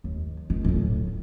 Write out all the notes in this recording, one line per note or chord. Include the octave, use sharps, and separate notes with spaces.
D#2
D#3
D1 A2